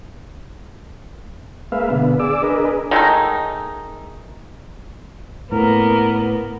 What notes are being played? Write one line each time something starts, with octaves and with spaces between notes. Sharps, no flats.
G#3 A#3 B4 E5 F5
B2 D3 B3
G#4 D5 D6 E6
D4 G#4 A#4 B4 D#5
D#3 G#3 A3 D#4
A2 A#3 B3 A#4